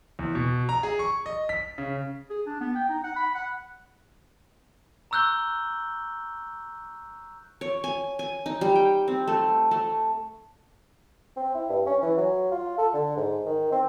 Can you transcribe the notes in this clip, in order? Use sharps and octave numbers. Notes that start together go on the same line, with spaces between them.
E2
B2
A#5
G#4
C#6
D#5
B6
C#3
G#4
D4
B3
G5
D#4
F#5
B5
F#5
A#5 C#6 E6 F#6 G6 G7
C#5
G#5
G#5
D#4
G3
G5
C4
A3
A3
C4
E4
G2
C#4
E3
F#3
F4
A4
D3
G#2
D#3
C4